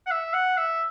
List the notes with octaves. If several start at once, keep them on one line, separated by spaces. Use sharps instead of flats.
F#5
E5
F#5
E5